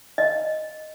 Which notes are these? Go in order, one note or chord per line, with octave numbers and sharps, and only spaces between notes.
D#5